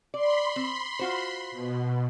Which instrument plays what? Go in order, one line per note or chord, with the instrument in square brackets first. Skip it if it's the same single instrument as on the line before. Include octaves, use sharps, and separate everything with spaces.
[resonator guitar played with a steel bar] D5 [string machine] B5 C6
[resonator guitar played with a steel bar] C4
F4 F#4 C5
[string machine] B2